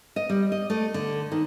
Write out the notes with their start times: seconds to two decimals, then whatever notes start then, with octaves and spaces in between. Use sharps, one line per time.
0.16 D#5
0.29 G3
0.52 D#5
0.70 A3
0.94 D3
1.32 D#3